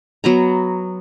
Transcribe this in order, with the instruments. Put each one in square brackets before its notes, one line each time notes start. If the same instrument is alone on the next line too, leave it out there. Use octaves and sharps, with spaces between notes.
[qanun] F#3 B3 A#5